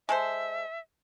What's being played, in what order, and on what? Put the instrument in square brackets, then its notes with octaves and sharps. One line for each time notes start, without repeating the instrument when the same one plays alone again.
[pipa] G#3 A4 C5 [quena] E5